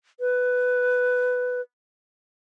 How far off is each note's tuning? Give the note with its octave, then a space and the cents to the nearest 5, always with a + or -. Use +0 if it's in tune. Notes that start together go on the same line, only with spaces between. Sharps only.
B4 +10